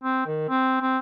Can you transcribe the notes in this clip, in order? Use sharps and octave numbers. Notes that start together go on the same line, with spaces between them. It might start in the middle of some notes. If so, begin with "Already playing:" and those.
C4
D#3
C4
C4